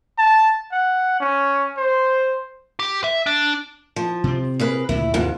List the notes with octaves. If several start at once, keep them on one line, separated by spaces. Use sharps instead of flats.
A5
F#5
C#4
C5
G4
E5
D4
F3
C3 C4
G#4 A#4 B4
D2 A#2 C#3 E4
D#2 G#2 C3 F3